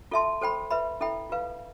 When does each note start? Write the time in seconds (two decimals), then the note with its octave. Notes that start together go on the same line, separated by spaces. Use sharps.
0.11 F4 A4 E5 A5 C6
0.41 A4 C5 G5 B5
0.70 B4 E5 B5
1.01 E4 A4 E5 G5 B5
1.30 F4 B4 F5